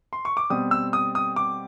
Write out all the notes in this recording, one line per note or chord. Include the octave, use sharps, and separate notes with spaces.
C6
C#6
D6
B2 G3 C4 D#6
E6
D#6
D#6
D6